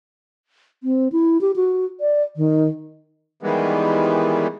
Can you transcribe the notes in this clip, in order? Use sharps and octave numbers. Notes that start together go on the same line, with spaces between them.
C4
E4
G4
F#4
D5
D#3
D#3 E3 G3 G#3 B3